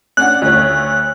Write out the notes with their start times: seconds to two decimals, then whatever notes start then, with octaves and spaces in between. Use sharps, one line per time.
0.17 C#4 D4 F#5 F#6
0.42 D2 C#5